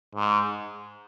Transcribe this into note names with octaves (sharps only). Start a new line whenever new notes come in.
G#2